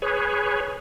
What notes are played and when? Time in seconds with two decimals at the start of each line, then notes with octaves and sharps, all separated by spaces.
0.02 G#4 B4 C#5